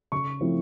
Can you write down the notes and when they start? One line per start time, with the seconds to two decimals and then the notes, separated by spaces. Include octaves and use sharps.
0.12 C#3 C#6
0.41 F3 A3 C4 E4